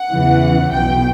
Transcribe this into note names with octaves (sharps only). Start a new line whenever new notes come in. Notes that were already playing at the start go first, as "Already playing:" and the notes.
Already playing: F#5
E2 C#3 E3
B1 B2 G5